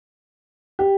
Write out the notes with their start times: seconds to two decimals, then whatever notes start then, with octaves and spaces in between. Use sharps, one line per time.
0.79 G4